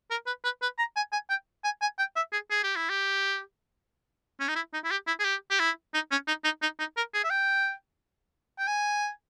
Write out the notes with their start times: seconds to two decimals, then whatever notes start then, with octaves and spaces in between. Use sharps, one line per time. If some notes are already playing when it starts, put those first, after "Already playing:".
0.11 A#4
0.27 B4
0.44 B4
0.62 B4
0.79 A#5
0.96 G#5
1.13 G#5
1.30 G5
1.64 G#5
1.82 G#5
1.99 G5
2.16 E5
2.33 G#4
2.51 G#4
2.64 G4
2.76 E4
2.90 G4
4.40 C#4
4.48 D#4
4.56 E4
4.74 D#4
4.84 E4
4.91 G4
5.07 E4
5.20 G#4
5.25 G4
5.51 G4
5.60 E4
5.94 D#4
6.11 C#4
6.28 D#4
6.45 D#4
6.62 D#4
6.79 D#4
6.97 A#4
7.14 G#4
7.24 E5
7.31 G5
8.59 G5
8.68 G#5